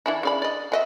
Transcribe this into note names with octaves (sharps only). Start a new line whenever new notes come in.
E3 D4 E4
C#3 D5 B5
D5 D#5
F#3 D#5 E5